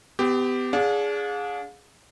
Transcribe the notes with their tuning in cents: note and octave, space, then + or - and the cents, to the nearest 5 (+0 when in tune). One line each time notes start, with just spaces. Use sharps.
B3 +35 G4 +0
D4 -30 G#4 +0 F5 +40